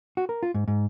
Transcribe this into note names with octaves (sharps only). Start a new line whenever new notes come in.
F#4
A#4
F4
G#2
G#2